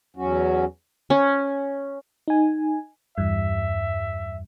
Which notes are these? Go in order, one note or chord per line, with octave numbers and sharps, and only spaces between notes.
E2 F#3 C#4 F#4
C#4
D#4 G#5
E2 G2 E5